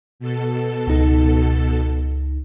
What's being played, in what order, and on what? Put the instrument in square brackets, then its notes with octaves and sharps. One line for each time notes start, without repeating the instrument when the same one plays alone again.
[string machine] B2 A4
[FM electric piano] C#2 D#4